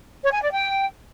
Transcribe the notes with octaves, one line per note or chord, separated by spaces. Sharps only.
C#5
G#5
D5
G5